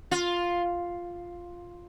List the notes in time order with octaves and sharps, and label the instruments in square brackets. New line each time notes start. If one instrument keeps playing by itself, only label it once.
[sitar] F4